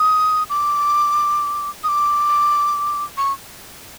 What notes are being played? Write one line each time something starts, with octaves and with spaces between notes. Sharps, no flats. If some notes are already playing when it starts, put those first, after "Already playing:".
Already playing: D#6
D6
D#6
D6
C#6